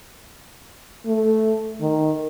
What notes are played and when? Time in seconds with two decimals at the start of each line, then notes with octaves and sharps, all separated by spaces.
1.06 A3
1.81 D#3